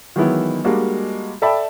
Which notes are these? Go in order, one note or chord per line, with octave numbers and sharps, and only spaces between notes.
D#3 E3 F#3 G#3 B3 E4
G3 G#3 A#3 D4 F#4
A4 D5 E5 G5 A5 B5